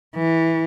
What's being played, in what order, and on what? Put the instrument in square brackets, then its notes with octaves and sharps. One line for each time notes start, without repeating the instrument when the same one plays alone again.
[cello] E3